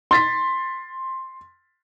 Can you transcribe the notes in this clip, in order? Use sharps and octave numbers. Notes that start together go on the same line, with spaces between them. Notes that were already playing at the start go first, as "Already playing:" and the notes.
C6 A6 B6